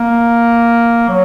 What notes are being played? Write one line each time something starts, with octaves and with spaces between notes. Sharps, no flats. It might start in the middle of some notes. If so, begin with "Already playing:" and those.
Already playing: A#3
F#3